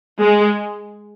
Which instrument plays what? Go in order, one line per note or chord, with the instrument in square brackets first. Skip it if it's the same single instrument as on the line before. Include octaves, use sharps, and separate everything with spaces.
[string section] G#3